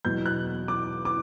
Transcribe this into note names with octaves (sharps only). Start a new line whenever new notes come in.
E2 B2 F#3 G6
F#6
D6
D6